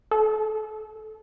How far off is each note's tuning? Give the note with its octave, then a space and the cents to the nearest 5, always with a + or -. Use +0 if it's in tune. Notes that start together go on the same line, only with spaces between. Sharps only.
A4 -15